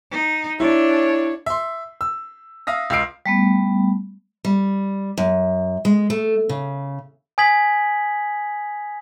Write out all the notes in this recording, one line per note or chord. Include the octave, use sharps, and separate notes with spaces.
D#4
D4 E4 C#5
E5 C6
E6
E5 F5 D#6 A#6
C#2 F4 E6 C7 D7
G3 A3 B3
G3
F#2
G#3
A3
C#3
G#5 D#6 G#6 B6 F#7